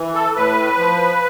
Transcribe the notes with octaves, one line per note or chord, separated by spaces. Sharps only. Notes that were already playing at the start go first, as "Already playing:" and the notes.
Already playing: E3
A4
A2 B4
F3